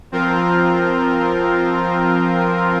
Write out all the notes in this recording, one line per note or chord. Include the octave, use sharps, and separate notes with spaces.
F3 C4 F4 A#4